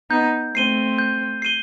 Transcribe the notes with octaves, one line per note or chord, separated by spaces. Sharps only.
B3 D#4 G6
A3 C4 C7 D#7 G7
G6
C7 D#7 G7